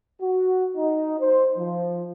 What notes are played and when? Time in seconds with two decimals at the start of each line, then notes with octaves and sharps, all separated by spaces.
0.20 F#4
0.76 D#4
1.18 C5
1.56 F3